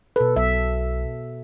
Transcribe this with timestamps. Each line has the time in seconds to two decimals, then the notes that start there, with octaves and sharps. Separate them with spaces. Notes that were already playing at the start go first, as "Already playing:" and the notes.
0.16 B2 A4 B4
0.36 B1 E5